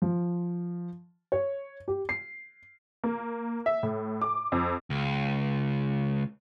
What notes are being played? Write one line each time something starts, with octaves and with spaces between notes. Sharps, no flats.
F3
C#5
G4
C7
A#3
E5
A2
D6
F2
C#2